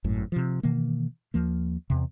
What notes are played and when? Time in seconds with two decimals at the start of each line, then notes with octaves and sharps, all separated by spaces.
0.04 G#1 F#2 A2
0.32 C3 F3
0.63 B2 D#3 E3 A#3
1.34 D#2 F3 A#3
1.90 E2 C3